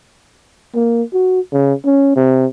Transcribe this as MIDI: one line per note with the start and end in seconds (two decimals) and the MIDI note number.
0.75 1.03 58
1.14 1.40 66
1.53 1.73 49
1.85 2.13 61
2.16 2.46 48